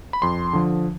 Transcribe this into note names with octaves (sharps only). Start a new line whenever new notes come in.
B5
F2 C6
D3 F3